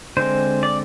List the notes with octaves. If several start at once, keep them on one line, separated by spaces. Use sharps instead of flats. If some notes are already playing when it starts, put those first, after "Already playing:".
D3 G#3 C4 C5
D5